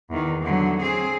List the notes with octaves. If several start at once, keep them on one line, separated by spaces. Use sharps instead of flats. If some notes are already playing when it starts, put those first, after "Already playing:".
E2 D#3
D3 F#3
C4 G#4